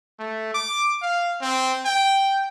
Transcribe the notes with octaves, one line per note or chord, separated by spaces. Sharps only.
A3
D6
F5
C4
G5